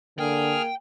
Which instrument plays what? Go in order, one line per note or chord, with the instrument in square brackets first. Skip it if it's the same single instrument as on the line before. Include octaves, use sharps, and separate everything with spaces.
[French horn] D3 [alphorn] A#3 [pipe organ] G#4 F6 [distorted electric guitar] G5